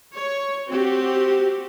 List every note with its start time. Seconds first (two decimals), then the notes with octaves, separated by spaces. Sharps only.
0.13 C#5
0.69 C4 F#4 G4